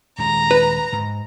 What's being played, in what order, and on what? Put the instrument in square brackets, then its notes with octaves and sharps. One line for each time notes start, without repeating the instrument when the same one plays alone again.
[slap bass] D#1 G#3 [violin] A#5
[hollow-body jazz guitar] B4
[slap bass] G#2